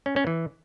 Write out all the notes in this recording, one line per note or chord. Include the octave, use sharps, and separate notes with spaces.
C#4
C#4
E3